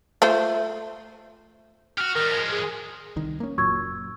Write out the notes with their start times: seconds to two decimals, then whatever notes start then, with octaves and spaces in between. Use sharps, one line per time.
0.22 A3 F4 C5
1.98 F#4 G4 F6
2.16 D#3 G3 A#4
2.30 F3 G#3
2.52 G#4
3.16 C2 D#3
3.40 A#3 C#4
3.58 F#1 A#2 F#3 C#6 E6 G#6